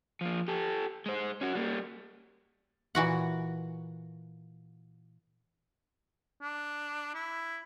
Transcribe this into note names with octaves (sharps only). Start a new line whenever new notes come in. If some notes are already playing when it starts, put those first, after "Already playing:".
F3 A#3
G4 A4
G#3 C5
C#4 F#4
G3 A#3
A#2 E3 F#4 F#5
D4
E4